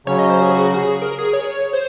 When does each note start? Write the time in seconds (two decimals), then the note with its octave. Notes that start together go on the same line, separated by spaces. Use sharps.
0.06 C#3 F#3 C#4 C#5
0.19 D#5
0.30 C5
0.42 G#4
0.55 F#4
0.74 F#4
0.78 G#4
1.02 A#4
1.18 G#4
1.33 C#5
1.50 C#5
1.73 C5